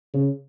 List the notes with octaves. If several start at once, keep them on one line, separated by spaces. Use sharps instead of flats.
C#3